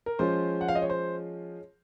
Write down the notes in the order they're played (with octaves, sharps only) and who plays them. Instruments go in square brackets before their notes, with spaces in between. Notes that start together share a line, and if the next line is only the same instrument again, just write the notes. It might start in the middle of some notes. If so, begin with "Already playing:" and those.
[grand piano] A#4
F3 G#3 C#4 F4 C5
F#5
F5
D#5
C#5
C5